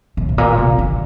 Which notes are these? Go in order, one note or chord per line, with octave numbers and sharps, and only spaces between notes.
A2
A2
A#2
C3
D3